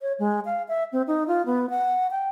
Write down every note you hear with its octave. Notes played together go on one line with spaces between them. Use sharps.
C#5
G#3
F5
E5
C4
D#4
F4
B3
F#5
G5